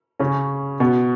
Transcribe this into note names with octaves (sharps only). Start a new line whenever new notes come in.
C#3 C#4
B2 B3